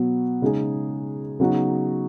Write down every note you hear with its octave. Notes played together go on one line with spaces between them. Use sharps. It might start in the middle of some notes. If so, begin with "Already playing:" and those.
Already playing: B2 F#3 B3
C#3 G#3 D#4 G#4
C#3 F#3 B3 D#4 F#4